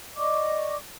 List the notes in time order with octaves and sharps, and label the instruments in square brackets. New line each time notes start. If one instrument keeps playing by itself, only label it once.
[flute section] D5 D#5 C#6 D6